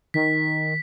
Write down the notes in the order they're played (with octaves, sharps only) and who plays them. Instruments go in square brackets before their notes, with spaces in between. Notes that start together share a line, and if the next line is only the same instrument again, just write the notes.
[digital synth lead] D#3 [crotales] B6